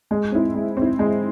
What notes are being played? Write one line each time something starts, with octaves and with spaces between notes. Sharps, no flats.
G#3
C4 E4
G#3
C4 E4
G#3